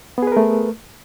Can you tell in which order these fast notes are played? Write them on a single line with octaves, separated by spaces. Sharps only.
B3 G#4 B4 A#4 A3